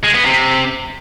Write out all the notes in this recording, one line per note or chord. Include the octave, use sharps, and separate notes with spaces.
G#3
B3
C3